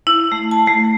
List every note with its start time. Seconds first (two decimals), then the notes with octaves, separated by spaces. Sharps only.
0.07 E4
0.32 A3
0.51 A5
0.67 A3